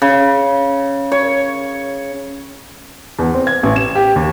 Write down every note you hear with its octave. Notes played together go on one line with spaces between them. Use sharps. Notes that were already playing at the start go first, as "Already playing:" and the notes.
C#3
C#5
E2
C4
G#6
A1
E7
G4
D#2